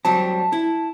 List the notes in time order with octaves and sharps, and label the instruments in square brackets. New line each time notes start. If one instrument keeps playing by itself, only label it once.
[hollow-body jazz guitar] F#3 G3 C4 [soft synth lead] A5
[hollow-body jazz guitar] E4